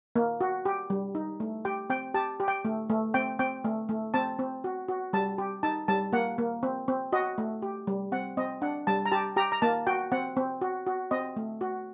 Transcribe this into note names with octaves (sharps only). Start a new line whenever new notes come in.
A#3
F#4
G4
G3
D#4
A3
G4 G5
C4 G5
G4 A5
G4
G5
A3
A3
C4 G5
C4 G5
A3
A3
C4 A5
C4
F#4
F#4
G3 A5
G4
D#4 A5
G3 A5
A#3 F#5
A#3
C4
C4
F#4 D#5
A3
G4
G3
C4 F#5
C4 D#5
D4 F#5
G3 A5
A#5
G4 A5
G4 A#5
A#5
A#3 A5
F#4 G5
C4 F#5
C4
F#4
F#4
C4 D#5
A3
F#4